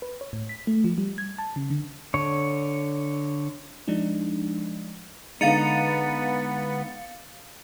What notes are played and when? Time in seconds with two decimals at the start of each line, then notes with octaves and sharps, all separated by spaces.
0.02 B4
0.21 C#5
0.33 A2
0.49 B6
0.67 A3
0.84 F3
0.98 G3
1.18 G#6
1.38 A5
1.56 C#3
1.70 D3
2.14 D3 C#5
3.88 F3 G#3 D4 D#4
5.41 D3 G#3 B3 D#4 F5 A6 C#7